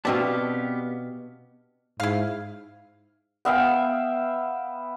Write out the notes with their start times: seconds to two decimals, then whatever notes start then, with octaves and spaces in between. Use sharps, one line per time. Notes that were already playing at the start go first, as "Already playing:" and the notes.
0.05 B2 B3 C4 D4 G4 F5 A5
2.00 G#2 E4 F5
3.45 B3 E5 F5 G5